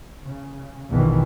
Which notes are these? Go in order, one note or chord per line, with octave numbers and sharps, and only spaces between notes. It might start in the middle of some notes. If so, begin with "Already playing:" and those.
C#3
A#1 E2 G2 B2 D#3 E3